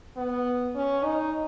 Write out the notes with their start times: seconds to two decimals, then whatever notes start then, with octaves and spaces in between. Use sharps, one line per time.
0.17 B3
0.75 C#4
1.05 D#4